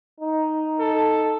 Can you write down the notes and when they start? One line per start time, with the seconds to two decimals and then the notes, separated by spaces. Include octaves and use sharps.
0.20 D#4
0.79 A4